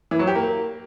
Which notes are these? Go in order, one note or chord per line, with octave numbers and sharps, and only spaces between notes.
E3
F#3
G4
A#3